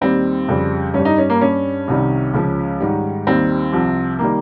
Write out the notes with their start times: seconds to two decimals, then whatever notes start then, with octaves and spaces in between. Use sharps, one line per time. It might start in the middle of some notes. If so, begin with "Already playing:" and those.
0.01 D#2 D#3 G3 C4
0.48 F2 C#3 G3
0.94 G2 G3 C#4
1.05 D#4
1.18 C#4
1.30 A#3
1.41 G2 G3 C#4
1.88 C2 C3 D#3 G3
2.33 C#2 C#3 F3
2.80 G#2 D#3 G3
3.27 D#2 D#3 G3 C4
3.72 C2 C3 F3
4.19 D#3 G3 A#3